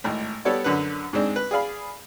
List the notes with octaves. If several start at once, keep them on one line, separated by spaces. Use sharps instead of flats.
G#1 A2
G3 B3 A4 C#5 D5
F#2 D3 B4
G#2 G#3 C4 D4
B4
G#4 D5 F5 B5